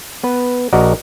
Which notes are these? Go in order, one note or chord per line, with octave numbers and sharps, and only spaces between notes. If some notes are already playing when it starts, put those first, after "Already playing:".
B3 B4
A#1 F#4 A#4 D5 D#5 F#5